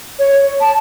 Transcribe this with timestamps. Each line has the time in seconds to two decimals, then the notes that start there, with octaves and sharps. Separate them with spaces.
0.19 C#5
0.61 A5